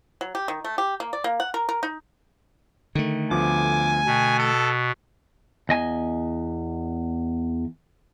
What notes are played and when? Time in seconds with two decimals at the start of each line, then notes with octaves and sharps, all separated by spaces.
0.21 F#3
0.35 G4
0.48 D#3
0.64 A3
0.78 G4
1.00 A#3
1.13 D5
1.24 A#3
1.40 F#5
1.54 A#4
1.69 A#4
1.83 D#4
2.95 D3 D#3 A3
3.31 D2 F3 B3 G#5 D6
4.06 B2 G5 A5
4.39 A4
5.69 E2 D#5 G#5